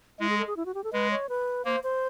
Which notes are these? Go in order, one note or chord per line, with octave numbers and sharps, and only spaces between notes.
G#3 E4
G#4
A4
G#4
E4
F#4
G4
A4
G#3 B4
C#5
B4
A#3 C5
C5